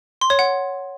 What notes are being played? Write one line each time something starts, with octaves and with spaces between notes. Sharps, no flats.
C6
C#5
F#5